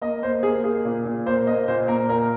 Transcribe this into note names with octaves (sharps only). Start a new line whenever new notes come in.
A#3 D#5
A#3 C5
A#3 G#4
A#3 G#4
A#2
A#2
A#3 C5
A#3 D#5
A#2 C5
A#3 A#4
A#2 A#4